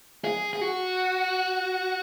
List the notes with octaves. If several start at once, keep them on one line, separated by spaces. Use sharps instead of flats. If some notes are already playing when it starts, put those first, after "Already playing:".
G#4
G#4
F#4